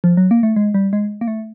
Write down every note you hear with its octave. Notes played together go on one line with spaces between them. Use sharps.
F3
F#3
A#3
A3
G#3
G3
G#3
A#3
A3